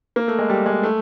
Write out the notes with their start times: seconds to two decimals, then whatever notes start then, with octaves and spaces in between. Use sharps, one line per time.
0.16 A#3
0.28 A3
0.39 G#3
0.50 G3
0.66 G#3
0.83 A3